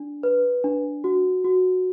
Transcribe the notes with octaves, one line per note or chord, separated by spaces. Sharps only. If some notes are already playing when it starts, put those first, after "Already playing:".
Already playing: D4
B4
D4
F#4
F#4